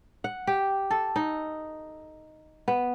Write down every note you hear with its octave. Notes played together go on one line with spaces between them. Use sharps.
F#5
G4
A4
D#4
B3